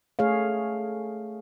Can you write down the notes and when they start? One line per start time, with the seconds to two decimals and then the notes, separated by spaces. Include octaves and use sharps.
0.19 A3 G#4 C#5 F5